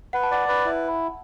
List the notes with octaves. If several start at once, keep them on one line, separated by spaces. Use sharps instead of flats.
B4 F#5
A5
D5 F#5
B4
E4